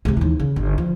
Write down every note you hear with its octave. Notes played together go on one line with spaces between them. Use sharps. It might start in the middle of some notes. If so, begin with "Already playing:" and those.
C3 G#3
D#2 E3
C#3
G1
F3